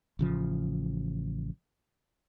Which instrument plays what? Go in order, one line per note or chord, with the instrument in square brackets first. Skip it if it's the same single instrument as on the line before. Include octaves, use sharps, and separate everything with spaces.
[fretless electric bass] A1 C#3 F3